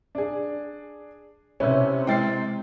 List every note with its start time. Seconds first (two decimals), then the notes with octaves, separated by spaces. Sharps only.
0.15 D4 G#4
1.60 C3 C#4 E4 B4
2.07 G#3 E4 G5 A6 C7